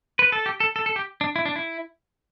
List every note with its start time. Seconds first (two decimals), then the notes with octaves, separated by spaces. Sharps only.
0.19 B4
0.32 A4
0.46 G4
0.60 A4
0.76 A4
0.86 A4
0.96 G4
1.21 D4
1.36 E4
1.46 D4
1.56 E4